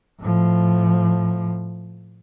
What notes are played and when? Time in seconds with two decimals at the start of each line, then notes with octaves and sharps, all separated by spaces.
0.20 A2 F3